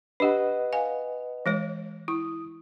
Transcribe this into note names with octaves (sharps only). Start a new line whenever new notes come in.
D4 G4 B4 D#5 F#5
F5 G#5
E3 G#3 C#5
E4 D#6